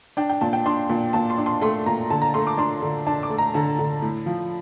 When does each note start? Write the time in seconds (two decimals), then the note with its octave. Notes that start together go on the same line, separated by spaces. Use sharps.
0.17 D4 G5
0.29 G5
0.41 A#2 A5
0.53 G5
0.66 D4 C6
0.89 A#2
1.13 A#2 A5
1.30 C6
1.38 D4
1.46 C6
1.62 A3 C6
1.86 A#2 A#5
2.10 D3 A5
2.22 A#5
2.34 A3 C6
2.47 D6
2.58 D4 C6
2.82 D3
3.07 D4 A5
3.23 D6
3.30 A3
3.38 A#5
3.54 D3 A5
3.79 D3
4.02 A2
4.26 F3